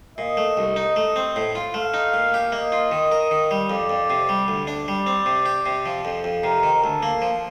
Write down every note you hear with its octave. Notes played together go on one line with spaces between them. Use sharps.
A#2 D#5
A3
C2
D#4
A3
C4
A2
F4
A3 F5
D#4
A#2
G4
A#3 D#5
F4
D#3
A#4
D#3
G3
F2 D5
F2
C3
G3
D2
D4
G3 D5
C4
C3
G4
C3
F3
F2
F2
C3 A#4
D#3
D2 A4
A#3
F3